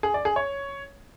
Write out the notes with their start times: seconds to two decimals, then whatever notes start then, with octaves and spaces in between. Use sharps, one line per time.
0.03 G#4
0.14 D5
0.25 G#4
0.36 C#5